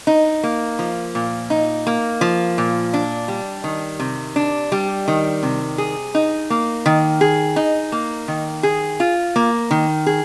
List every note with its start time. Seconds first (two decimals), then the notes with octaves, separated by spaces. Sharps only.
0.07 D#4
0.43 A#3
0.79 F3
1.15 A#2
1.50 D#4
1.87 A#3
2.21 F3
2.58 A#2
2.93 D4
3.28 G3
3.64 D#3
3.99 C3
4.36 D4
4.72 G3
5.08 D#3
5.43 C3
5.78 G#4
6.15 D#4
6.50 A#3
6.86 D#3
7.21 G#4
7.56 D#4
7.92 A#3
8.28 D#3
8.63 G#4
9.00 F4
9.36 A#3
9.71 D#3
10.06 G#4